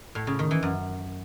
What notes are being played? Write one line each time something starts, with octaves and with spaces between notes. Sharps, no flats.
A2
C#3
D#3
E3
F#2